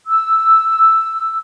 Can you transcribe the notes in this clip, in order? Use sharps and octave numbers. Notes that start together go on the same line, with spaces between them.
E6